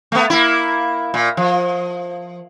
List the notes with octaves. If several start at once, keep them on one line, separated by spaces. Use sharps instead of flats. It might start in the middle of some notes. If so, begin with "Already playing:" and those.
A3 B3
A#3 E4
A#2
F3